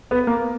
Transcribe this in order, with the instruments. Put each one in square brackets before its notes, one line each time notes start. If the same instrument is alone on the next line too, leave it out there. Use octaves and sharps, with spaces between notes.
[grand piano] B3
A#3